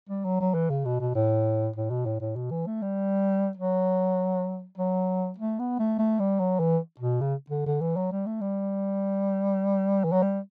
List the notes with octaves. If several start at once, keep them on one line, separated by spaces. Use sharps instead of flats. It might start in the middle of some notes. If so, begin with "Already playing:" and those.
G3
F#3
F#3
E3
C#3
B2
B2
A2
A2
B2
A2
A2
B2
E3
A3
G3
F#3
F#3
A3
B3
A3
A3
G3
F#3
E3
B2
C#3
D3
D3
E3
F#3
G3
A3
G3
E3
F#3
G3